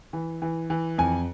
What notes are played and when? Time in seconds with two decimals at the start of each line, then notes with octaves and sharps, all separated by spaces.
0.13 E3
0.42 E3
0.70 E3
0.98 F2 G#5